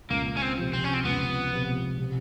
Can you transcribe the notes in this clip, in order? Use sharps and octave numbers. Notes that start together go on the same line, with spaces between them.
C#2 A#3
C#4
C4
C3 F3
C4
C#4
C4
C#2 B3
C3 F3
C3